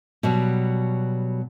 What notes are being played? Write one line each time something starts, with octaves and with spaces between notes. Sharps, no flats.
B2 F#3 G3